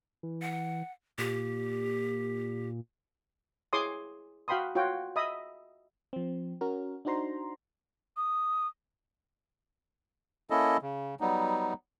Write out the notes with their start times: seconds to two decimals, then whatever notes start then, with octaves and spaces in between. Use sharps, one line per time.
0.23 E3
0.42 F#5
1.18 A#2 G4
3.73 E4 G#4 C#5 C6 D6 D#6
4.48 F#4 F5 G5 B5 C6 D#6
4.75 F4 F#4 C#5 G5
5.16 D#5 E5 B5 D#6
6.13 F3 C4
6.61 C#4 F#4 A#4
7.05 D4 D#4 F#4 C5 A#5 C6
8.17 D#6
10.50 A#3 C#4 E4 A4 D#5
10.82 C#3
11.20 F#3 G3 B3 D#4